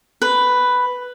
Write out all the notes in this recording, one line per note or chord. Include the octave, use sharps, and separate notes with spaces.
B4